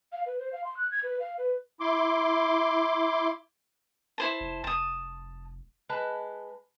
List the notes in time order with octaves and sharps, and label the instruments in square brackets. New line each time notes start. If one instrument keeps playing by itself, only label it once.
[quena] F5
B4
C5
F5
C6
F#6
G#6
B4
F5
B4
[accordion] E4 C6 D6
[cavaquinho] E4 C5 A5
[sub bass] F1
[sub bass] F1 [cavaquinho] A5 D#6
[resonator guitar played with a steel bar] G#3 B4 A5